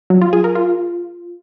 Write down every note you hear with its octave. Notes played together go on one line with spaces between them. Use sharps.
F#3
F4
G#4
A#4
F4